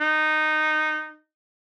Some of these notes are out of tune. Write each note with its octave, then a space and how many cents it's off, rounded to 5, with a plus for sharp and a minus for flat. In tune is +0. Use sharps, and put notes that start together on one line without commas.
D#4 -15